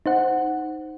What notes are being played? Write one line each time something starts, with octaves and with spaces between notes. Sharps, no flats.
D#4 C5 F#5